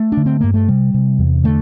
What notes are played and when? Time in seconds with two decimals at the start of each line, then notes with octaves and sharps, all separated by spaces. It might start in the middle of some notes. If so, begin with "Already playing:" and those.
Already playing: A3
0.12 D4
0.17 D3
0.26 C4
0.41 G2 A#3
0.54 A3
0.68 C3 G3
0.94 C3
1.19 E2
1.44 D3 A3